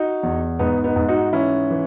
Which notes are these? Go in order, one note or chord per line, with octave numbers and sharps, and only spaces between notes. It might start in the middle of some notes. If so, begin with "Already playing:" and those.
Already playing: D#4 F#4
E2
G#2 B3 D#4
B3 D#4
G#2
D#4 F#4
E3 C#4 E4
E3